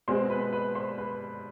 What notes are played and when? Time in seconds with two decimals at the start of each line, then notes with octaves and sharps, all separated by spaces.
0.08 B2 G#3 C4 C5 C6
0.30 B4 B5
0.52 B4 B5
0.75 C5 C6
0.98 B4 B5